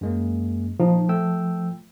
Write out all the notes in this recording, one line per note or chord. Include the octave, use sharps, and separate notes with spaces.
F#2 G#3 A#3
A#2 F3 D#4
A3 G5 E6